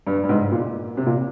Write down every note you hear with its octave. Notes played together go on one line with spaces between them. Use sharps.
G2
G2
G#2
A#2
C3
A#2